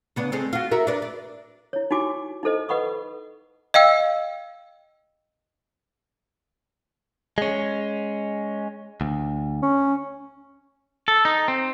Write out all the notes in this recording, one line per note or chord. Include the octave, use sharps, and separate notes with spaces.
C#3 B3 D4
G#3 A3 C4
F4 F#4
F#4 A#4 E5
D4 B4 D5
D5
E4 C#5
D#4 E4 F#4 G4 G#5 D6
D#4 E4 A4 C5 D#5
B4 D#5 F#5 B5 C#6 D#6
D#5 F5 G5 E6
G#3 C#4
D2
C#4
A4
D#4
C4